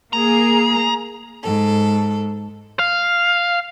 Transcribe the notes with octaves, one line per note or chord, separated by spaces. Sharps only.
A#3 G#4 A#5
G#2 A4
F5